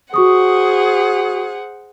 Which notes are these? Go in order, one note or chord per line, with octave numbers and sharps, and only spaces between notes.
F#4 G#4 C5 F#5 C#6 D#6